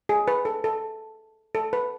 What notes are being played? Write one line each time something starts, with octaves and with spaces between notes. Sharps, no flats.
G#4
B4
A4
A4
A4
B4